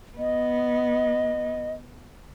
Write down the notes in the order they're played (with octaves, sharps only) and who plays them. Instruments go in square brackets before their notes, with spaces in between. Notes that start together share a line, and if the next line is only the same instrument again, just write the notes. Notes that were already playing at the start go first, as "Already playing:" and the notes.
[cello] B3 [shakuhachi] D#5